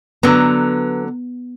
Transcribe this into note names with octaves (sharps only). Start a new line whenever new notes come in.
D3 F#3 B3 A#5